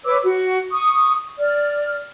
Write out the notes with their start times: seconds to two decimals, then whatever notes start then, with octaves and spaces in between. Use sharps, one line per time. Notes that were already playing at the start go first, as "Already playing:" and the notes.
0.05 B4 C#5 D6 E6
0.23 F#4
0.71 C#6 D#6
1.39 D5 F6